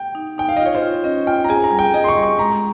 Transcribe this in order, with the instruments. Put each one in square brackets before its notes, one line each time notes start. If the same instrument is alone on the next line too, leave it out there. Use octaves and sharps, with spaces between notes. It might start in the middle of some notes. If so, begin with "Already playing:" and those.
Already playing: [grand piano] G5
[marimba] D#4
[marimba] D#4 [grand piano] G5
[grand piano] F5
[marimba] F4 [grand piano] D#5
[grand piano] C#5
C5
[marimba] F4
[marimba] C#4 [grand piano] D#5
[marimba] F4 [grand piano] G5
[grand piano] A#5
[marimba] G#4 [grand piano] G#5
[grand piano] A#5
[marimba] G3
[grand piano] G5
[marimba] G#4 [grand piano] D#5
[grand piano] C6
C#6
[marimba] G3
[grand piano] C#6
[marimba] G#3 [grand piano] A#5